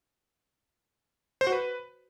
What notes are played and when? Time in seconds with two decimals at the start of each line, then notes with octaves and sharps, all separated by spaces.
1.41 C5
1.47 F#4
1.52 B4